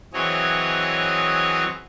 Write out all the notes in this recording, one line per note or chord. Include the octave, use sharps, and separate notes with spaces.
E3 F#3 C4 G#4 C#5 D#5